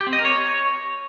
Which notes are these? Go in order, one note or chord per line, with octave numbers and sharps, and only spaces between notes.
G4
C4
D#5
A#4
C#5